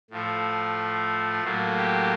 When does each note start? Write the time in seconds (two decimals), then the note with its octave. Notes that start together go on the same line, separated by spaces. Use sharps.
0.10 A2 F3 A3
1.43 A2 F#3 A#3
1.76 G4